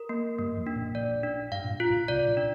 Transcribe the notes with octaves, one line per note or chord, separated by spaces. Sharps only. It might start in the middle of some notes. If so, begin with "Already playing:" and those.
Already playing: A#4
A#3
G2 G3 A#3
F2 F3
D4
A#1 A#2
A#1 A#2 D5
D4
G2 F5
A#2
G2
F4
A#1 A#2
C2 C3 D5
C3
A#1 A#2
D4